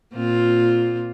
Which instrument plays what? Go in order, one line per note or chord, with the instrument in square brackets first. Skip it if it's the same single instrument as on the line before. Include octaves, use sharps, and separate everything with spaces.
[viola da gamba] A#2 C4 F4